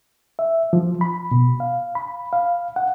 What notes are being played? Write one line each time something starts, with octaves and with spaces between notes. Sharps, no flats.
E5
F3
B5
B2
F5
B5
F5
F#5